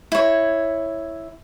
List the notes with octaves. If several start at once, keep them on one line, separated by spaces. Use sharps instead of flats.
E4 C#5